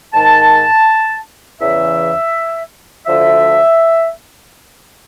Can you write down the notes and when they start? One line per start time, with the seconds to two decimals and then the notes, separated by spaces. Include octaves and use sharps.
0.14 G#2 D#3 A5
1.60 E2 C#3 E3 E5
3.07 D2 D3 F3 E5